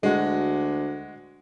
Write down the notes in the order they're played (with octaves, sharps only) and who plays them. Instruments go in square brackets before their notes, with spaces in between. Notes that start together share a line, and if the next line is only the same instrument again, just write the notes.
[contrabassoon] D2 [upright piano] G#3 F#4